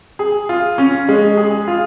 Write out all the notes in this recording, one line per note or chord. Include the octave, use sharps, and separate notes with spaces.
G#4
F4
C#4
G#3
G#4
F4